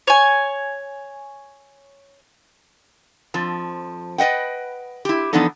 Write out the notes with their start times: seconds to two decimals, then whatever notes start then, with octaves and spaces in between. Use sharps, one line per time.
0.07 C#5 G#5
3.34 F2 F3
4.18 B4 D#5 F#5 G5
5.05 E4 G4
5.33 E3 F3 B3 D4 D#4 A4